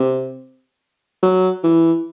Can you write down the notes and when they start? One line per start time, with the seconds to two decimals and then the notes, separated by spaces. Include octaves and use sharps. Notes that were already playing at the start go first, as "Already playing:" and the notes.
Already playing: C3
1.23 F#3
1.64 E3